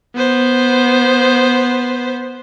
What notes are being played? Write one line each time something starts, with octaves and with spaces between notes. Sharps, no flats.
B3 C5